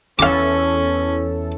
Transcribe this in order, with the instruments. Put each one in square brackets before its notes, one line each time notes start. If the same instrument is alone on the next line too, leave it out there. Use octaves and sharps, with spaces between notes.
[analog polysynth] E2 E3 A4 [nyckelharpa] C#4 [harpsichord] F5 D6